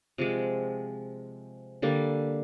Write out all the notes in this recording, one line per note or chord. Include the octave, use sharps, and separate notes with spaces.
C3 F3 G#3
D3 G3 A#3